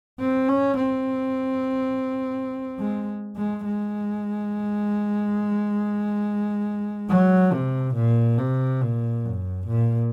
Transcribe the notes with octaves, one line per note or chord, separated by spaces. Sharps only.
C4
C#4
C4
G#3
G#3
G#3
F#3
C3
A#2
C3
A#2
F#2
A#2